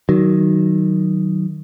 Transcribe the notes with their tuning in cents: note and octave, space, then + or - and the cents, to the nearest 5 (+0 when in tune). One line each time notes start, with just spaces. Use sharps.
D#3 -5 F#3 +15